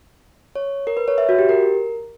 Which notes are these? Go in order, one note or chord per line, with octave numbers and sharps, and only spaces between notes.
C#5
A#4
B4
C#5
E5
F#4
G4
A#4